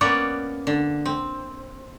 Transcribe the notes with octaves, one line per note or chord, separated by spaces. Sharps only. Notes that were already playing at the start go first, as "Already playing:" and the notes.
A#3 B3 C#4 C#5 D5 F#5
D3
C4